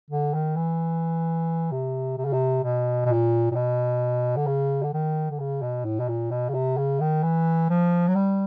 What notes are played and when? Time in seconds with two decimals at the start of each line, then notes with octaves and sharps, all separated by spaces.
0.10 D3
0.34 D#3
0.57 E3
1.72 C3
2.18 C3
2.25 C#3
2.33 C3
2.63 B2
3.05 B2
3.09 A#2
3.51 A#2
3.55 B2
4.36 D3
4.47 C#3
4.83 D3
4.93 D#3
5.30 D3
5.40 C#3
5.62 B2
5.85 A2
6.00 B2
6.08 A#2
6.31 B2
6.49 C#3
6.54 C3
6.77 C#3
7.00 D#3
7.23 E3
7.70 F3
8.08 F#3
8.15 G3